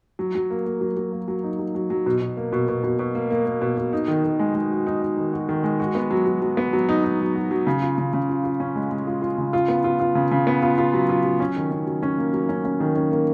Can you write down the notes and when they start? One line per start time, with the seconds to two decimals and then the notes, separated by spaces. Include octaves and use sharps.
0.19 F#3
0.35 F#3
0.50 A#3
0.65 A#3
0.81 F#3
0.97 F#3
1.13 A#3
1.28 F#3
1.43 D#4
1.59 F#3
1.75 F#3
1.90 F#3
2.06 B2
2.22 B2
2.37 A#3
2.52 B2
2.68 B2
2.84 B2
2.99 B2
3.15 A#3
3.30 A#3
3.46 A#3
3.62 B2
3.77 B2
3.93 D#4
4.08 D#3
4.24 D#3
4.39 G#3
4.55 G#3
4.71 F#4
4.87 D#4
5.02 D#4
5.17 D#3
5.33 F#4
5.49 D#3
5.64 G#3
5.80 F#4
5.95 B3
6.11 F#3
6.26 F#3
6.42 F#3
6.57 B3
6.73 F#3
6.89 D#4
7.04 D#4
7.20 F#3
7.35 F#4
7.51 F#3
7.67 C#3
7.82 F4
7.98 C#3
8.13 C#3
8.29 F4
8.44 F4
8.60 C#4
8.75 G#3
8.91 G#3
9.07 F4
9.22 F4
9.38 C#3
9.53 F4
9.68 B3
9.84 F4
10.00 F4
10.15 C#3
10.31 C#3
10.47 B3
10.62 F4
10.78 F4
10.93 F#3
11.09 F4
11.25 F#3
11.40 C#4
11.56 D#3
11.71 C#4
11.87 F#3
12.03 C#4
12.18 A#3
12.34 F#3
12.49 C#4
12.65 C#4
12.80 D#3
12.96 C#4
13.11 A#3